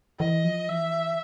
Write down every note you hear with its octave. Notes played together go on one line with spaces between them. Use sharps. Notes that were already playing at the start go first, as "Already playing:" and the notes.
E3 D#5
F3
E3 E5